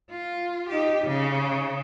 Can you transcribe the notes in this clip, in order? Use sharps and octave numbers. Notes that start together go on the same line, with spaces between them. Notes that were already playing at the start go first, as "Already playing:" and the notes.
F4
D#4 G4
C#3